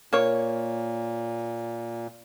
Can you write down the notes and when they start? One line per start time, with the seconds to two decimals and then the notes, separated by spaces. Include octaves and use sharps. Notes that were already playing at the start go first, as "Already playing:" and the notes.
0.13 A#2 A#3 C#5